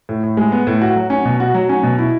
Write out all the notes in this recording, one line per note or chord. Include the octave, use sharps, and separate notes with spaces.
A2
A2
G#3
B3
A2
F#4
F#3
C#4
B2
F#4
F#3
C#4
B2
E4